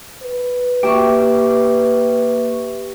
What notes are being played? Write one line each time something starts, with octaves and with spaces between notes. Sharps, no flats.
B4
A#3 G4 E5 C#6